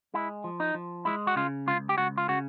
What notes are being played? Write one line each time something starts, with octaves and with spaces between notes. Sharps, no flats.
G#3 E4
F3
D#4
F3
G#3 E4
F#4
C#3 F4
C#2 F4
G4
C#2 F#4
F4
C#3 F#4